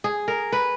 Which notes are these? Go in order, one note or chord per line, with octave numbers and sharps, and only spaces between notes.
G#4
A#4
B4